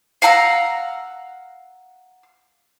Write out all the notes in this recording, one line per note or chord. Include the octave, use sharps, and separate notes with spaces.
F5 F#5 A#5 E6